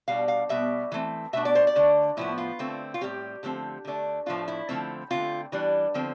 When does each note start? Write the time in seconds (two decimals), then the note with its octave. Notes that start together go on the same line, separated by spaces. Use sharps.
0.08 B2 G3 D4 F5
0.28 F5
0.49 B2 G3 B3 E5
0.92 E3 A3 C4
1.33 B2 A3 D4 E5
1.45 D5
1.55 C5
1.67 D5
1.75 D3 A3 D4
2.17 A2 F3 B3 E4
2.38 F4
2.59 D3 A3 C4
2.94 F4
3.01 A2 G3 C4 G4
3.43 D3 F3 A3 C4
3.85 D3 A3 D4
4.26 A2 F3 A3 D4 F4
4.48 E4
4.69 D3 F3 A3 C4
5.10 D3 A3 C4 F4
5.52 E3 G3 D4
5.94 D3 F3 C4